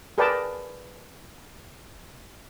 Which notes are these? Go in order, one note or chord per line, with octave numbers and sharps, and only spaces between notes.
G#4 A#4 B4 D5 G5 A5